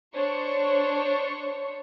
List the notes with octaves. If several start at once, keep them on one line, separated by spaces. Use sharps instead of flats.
D4 C5 C#5 C#6